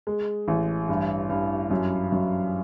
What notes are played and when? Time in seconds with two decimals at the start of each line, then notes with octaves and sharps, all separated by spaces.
0.07 G#3
0.48 A1
0.89 G2
1.29 G2
1.71 F#2
2.12 F#2